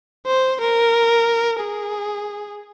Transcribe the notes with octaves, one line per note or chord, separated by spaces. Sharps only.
C5
A#4
G#4